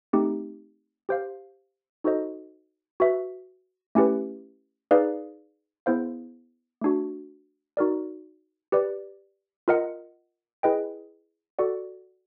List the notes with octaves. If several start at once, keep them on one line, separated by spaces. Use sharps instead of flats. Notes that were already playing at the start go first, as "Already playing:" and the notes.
A3 C4 D#4 G4
G4 C5 F5
D#4 F#4 A4 C5 D#5
F#4 B4 E5
A3 C#4 E4 G4 B4
D#4 G#4 B4 D5 F5
B3 E4 G#4 C5 F5
A3 D4 F#4
D#4 F#4 A#4 D5
G4 B4 D5
F4 A#4 D#5 F#5
E4 G#4 B4 D#5 G5
F#4 A4 D5 F#5